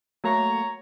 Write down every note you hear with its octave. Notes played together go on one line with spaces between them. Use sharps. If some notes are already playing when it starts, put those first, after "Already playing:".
F#3 A3 A#3 C#5 A#5